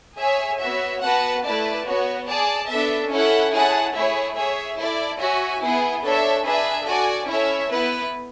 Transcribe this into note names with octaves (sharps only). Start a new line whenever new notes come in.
G#4 C#5 E5 G#5
B3 F#4 C#5 E5
B3 F#4 B4 F#5 A5
A3 E4 B4 D5 A5
B3 F#4 C#5
G#4 D5 A5
B3 D4 A4 E5
C#4 E4 A4 C#5 F#5
E4 G#4 C#5 F#5 A5
A3 E4 G#4 C#5 E5
G#4 C#5 E5
E4 A4 D5
F#4 C#5 E5 G#5
B3 E4 G#4
D4 A4 C#5 E5
D4 G#4 B4 E5 G#5
F#4 A4 D5 G#5
C#4 E4 A4 C#5 E5
B3 E4 B4